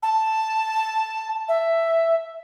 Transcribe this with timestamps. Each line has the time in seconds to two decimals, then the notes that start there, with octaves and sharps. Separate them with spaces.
0.03 A5
1.48 E5